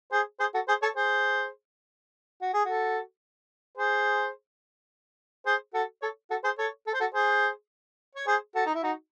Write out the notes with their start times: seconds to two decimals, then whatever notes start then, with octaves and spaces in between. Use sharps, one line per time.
0.12 G#4 C5
0.40 G#4 C5
0.54 F#4 A4
0.68 G#4 C5
0.82 A4 C#5
0.96 G#4 C5
2.42 F#4
2.53 G#4
2.65 F#4 A4
3.78 G#4 C5
5.46 G#4 C5
5.74 F#4 A4
6.02 A4 C#5
6.30 F#4 A4
6.44 G#4 C5
6.58 A4 C#5
6.87 A4
6.94 C5
7.00 F#4 A4
7.14 G#4 C5
8.15 C#5
8.27 G#4 C5
8.55 F#4 A4
8.66 D#4
8.75 E4
8.83 D#4 F#4